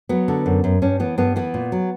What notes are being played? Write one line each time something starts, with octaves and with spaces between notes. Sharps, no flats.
F#3 B3
D3
F#2
F#2
G2 C#4
E3 B3
G2 B3
E3 B3
A#2
F#3